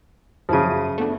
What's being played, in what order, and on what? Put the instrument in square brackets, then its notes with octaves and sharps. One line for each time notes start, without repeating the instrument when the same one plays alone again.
[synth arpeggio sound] F#2 E4 D#7 [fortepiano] C#3 F3
[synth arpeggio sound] A3 B3 D4